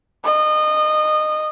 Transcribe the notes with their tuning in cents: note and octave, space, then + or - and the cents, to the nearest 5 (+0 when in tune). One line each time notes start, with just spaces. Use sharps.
D#5 -25